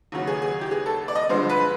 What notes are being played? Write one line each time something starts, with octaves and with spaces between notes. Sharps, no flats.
D#2 C#3 F#3
G#4
G#4
G4
G#4
A4
D5
D#5
G2 D3 F3 G#3 C5
B4